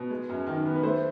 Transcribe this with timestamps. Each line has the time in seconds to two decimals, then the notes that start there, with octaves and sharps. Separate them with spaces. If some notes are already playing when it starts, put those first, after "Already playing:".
Already playing: B2
0.10 G#3
0.29 F#2
0.47 D#3
0.65 B3
0.76 B4
0.83 A3 C5